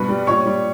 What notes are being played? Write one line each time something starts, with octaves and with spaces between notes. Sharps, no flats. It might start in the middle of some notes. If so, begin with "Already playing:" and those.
Already playing: G2 B2 B4 B5
G3
A#2 C#5 C#6
G3